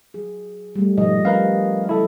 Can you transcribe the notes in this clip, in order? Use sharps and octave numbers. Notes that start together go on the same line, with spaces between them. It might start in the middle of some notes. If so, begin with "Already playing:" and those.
F#3 G#4
G3 A3
B1 G#2 F3 D#5
C#4 G4 A#4 B4 F5
C#3 F#3 E4 A4